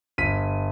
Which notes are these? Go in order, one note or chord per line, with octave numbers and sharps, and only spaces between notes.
G1 B6 D#7